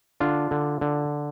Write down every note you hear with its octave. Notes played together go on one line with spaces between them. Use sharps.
D3 D4 F4
D3
D3